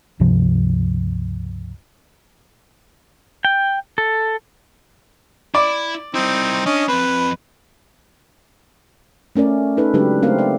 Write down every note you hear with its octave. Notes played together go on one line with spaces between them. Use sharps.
C#2 G2 C3 F3
G5
A4
E4 D5 B5
G3 C4 D#4 E4
C#4 D4 D#5
F2 C4 B4
A3 C#4 A#4 D5
D#4 A4 B4
C#3 F#3 G#3 D4 G4 B4
A3 C4 A#4 F5
D5